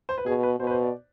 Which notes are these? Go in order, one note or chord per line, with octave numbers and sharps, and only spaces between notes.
C5
B4
B2 G#4
B4
B2 C5
B4
C5
D5